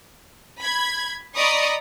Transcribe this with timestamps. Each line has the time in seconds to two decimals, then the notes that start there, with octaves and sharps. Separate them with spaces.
0.61 B5 G#6
1.35 D5 D#5 A#5 B5 C#6 D#6